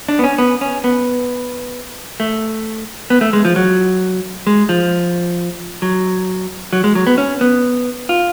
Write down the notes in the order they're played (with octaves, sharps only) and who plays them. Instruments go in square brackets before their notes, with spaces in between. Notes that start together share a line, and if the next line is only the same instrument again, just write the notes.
[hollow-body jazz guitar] D4
B3
C#4
B3
C#4
B3
A3
B3
A3
G#3
F3
F#3
G#3
F3
F#3
F#3
G#3
F#3
B3
C#4
B3
F4